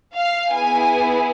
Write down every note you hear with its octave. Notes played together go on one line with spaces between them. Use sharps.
F5
B3 E4 G#4 G#5